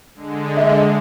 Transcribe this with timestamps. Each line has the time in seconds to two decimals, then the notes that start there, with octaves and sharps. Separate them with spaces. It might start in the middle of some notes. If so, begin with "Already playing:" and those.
0.15 D3 G#3
0.57 D#5 E5